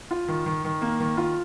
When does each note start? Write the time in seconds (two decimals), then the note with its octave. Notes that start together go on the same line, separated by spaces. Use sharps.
0.11 F4
0.28 D#3
0.46 D#3
0.64 D#3
0.81 A#3
1.00 D#3
1.17 F4